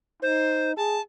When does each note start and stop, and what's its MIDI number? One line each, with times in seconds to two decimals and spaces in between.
0.22 0.73 63
0.22 0.72 72
0.77 1.00 68
0.77 1.01 81